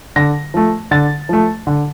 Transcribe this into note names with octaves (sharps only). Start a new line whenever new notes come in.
D3 A#6
F3 A3
D3 A6
F3 A3
D3